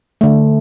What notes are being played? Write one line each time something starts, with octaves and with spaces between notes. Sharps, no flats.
D3 A3